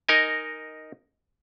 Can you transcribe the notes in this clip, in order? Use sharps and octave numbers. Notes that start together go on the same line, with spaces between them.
D#4 A#4 D#5 G#5